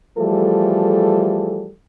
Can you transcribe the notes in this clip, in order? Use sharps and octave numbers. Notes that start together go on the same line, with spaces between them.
E3 F3 G3 A3 G#4 A4